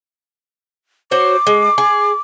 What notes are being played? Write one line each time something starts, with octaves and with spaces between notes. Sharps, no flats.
F#4 C5 C#5 D6
G#3
G#4